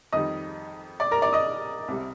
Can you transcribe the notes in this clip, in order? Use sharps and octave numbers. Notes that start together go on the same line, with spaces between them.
F2 D#3 G3 D#5 D#6
D5 D6
A#4 A#5
D5 D6
D#5 D#6
C2 C3 G3